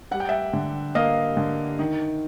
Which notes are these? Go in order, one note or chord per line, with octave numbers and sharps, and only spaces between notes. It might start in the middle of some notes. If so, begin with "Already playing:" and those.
G3 F#5
G5
E5 F#5
D3
A#3 D#5 F5
D3
D#3